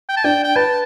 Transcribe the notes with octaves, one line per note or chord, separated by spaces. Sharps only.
G5
A5
D4 G5
G5
B4 A5